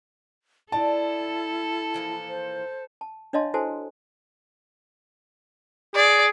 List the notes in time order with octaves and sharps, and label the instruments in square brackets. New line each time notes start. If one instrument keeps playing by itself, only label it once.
[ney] E4 [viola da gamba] A4 [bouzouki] D5 D#5 [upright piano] A5
[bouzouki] E3 F3 A#3
[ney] C5
[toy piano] A5
D4 C#5 D#5 F5 A5 C6
E4 F#4 A4 C5 G#5 A5
[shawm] G#4 [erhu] D5